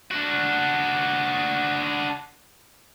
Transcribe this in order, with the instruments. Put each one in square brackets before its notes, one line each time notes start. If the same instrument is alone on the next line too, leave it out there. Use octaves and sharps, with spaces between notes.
[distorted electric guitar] D4 F#4